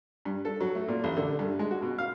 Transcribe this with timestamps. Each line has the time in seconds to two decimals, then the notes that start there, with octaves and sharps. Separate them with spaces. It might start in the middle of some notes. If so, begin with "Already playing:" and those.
0.25 G2
0.45 A4
0.60 F#3
0.75 A3
0.88 A#2
1.04 A1
1.17 D3
1.39 G2
1.59 G#3
1.71 F#4
1.82 B2
1.98 F5